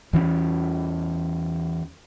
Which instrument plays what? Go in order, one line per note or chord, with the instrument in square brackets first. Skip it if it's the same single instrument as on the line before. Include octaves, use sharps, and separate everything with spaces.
[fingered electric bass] E2 E3 F3 C#4